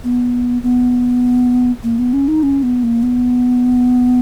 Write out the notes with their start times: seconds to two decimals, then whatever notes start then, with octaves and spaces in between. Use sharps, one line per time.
0.04 B3
0.63 B3
1.83 A#3
1.99 B3
2.13 C#4
2.28 D#4
2.43 C#4
2.63 B3
2.83 A#3
3.03 B3